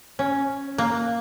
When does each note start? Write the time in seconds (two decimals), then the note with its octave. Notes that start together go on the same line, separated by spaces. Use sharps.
0.19 C#4
0.78 A#3